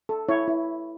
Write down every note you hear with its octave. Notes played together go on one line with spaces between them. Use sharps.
A4
E4 C#5
E4